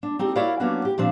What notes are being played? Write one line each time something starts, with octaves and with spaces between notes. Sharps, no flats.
D4
C4 D#4 G4 A4
E4 F#4 A#4 C#5 D5 F5
F#3 A#3 B3 C#4 D4 F#4
G4
A#2 F3 C4 D4